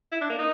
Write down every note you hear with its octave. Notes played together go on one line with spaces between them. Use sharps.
E4
D4
A#3
D#4